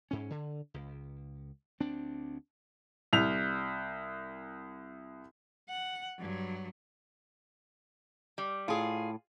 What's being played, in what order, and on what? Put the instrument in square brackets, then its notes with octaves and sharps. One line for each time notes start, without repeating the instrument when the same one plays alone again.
[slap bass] G#2 C#4
D3
C#2
D2 C4 D4
[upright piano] C2 F7
[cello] F#5
G2 F#3
[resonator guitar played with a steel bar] G3
[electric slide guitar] A2 [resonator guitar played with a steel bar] F4 G#4